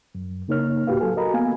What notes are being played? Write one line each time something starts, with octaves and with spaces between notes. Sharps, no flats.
F#2
C#3 A#3 D#4 A#4 C#5 F6
D2 A2 F#4 G4 B4 F5
F#3 A4 G#5
F#4 A#4 D#5 A#5 B5
A#3 B3 F5 G#5